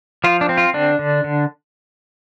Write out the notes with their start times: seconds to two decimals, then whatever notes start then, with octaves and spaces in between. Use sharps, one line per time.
0.24 F3 F4
0.41 D4
0.49 C4
0.58 F4
0.74 D3 D4
0.99 D3
1.24 D3